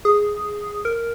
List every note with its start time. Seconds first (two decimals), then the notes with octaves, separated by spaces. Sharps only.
0.05 G#4
0.85 A#4